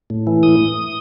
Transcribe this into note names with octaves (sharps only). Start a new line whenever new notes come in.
A2
E3
A2 D#6